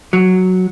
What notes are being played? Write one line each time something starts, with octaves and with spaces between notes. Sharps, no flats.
F#3